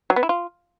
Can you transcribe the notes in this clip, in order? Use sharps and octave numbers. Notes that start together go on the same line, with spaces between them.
F#3
B3
E4
F4